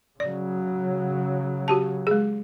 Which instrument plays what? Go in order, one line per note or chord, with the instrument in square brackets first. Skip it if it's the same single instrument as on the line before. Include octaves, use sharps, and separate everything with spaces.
[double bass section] C#3 F#3 [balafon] D5
[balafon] F#4 G4 A5
G#3 G#4